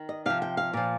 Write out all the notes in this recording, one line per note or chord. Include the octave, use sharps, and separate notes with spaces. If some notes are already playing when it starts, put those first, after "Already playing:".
Already playing: D#3
D#5
C3 F3 F5
G5
F5
A#2 F3